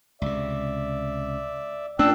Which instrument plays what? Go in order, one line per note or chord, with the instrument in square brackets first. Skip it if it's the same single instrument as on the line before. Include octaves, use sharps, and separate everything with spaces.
[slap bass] C#2 C3 [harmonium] D5 E5
[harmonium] A#2 G5 [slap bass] A3 C#4 [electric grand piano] D4 [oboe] E6